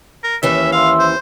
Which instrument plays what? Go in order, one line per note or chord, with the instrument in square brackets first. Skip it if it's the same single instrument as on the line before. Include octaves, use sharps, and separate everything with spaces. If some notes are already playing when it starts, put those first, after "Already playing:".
[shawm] A#4
[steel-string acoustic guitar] D#2 E3 C#4 [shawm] E5
[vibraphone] E5 C6 E6 [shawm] F5
[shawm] C5